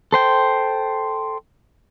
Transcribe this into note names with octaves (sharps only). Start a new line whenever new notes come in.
A4 C5 G5